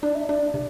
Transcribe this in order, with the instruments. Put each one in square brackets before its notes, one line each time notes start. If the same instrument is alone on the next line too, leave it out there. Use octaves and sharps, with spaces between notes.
[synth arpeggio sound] D4 [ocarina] D5
[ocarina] E5
[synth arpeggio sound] D4 [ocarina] D5
[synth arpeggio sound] C3